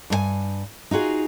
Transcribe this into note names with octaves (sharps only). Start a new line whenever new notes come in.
G2 A#4 G#5
D#4 F4 F#4 G#4